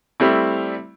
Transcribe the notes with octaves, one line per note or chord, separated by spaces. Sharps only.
G3 A3 C4 E4